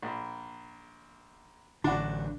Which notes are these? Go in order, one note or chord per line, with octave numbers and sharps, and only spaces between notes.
A#1
A1 D3 D4 F#4